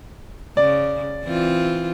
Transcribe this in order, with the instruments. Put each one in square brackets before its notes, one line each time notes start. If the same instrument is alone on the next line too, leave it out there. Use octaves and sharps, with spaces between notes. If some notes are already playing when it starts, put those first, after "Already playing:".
[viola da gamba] C#3 [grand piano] D5
[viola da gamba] E3 C4 F4